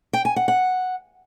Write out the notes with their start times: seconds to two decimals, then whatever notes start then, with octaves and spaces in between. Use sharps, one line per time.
0.13 G5
0.25 G#5
0.36 F#5
0.48 F#5